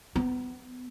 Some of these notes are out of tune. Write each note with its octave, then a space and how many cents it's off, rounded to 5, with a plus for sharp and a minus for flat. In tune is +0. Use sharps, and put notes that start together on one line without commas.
B3 +25